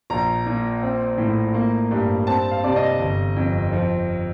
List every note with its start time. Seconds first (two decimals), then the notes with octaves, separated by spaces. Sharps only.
0.10 A#1 A#5
0.46 A#2
0.83 C4
1.18 A2
1.54 A#3
1.91 G2
2.27 C4 A5
2.51 F5
2.64 C3 D5
2.76 D#5
2.99 G1
3.36 F2
3.72 F3